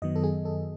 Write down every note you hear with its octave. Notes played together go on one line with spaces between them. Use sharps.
F#2 D#3 F#3 B3 D#5
A4
G#4
A4